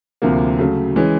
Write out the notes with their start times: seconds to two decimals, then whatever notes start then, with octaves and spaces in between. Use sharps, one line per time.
0.22 D2 C3 F3 A#3
0.58 C#3 F#3 A3
0.96 E3 G#3 C#4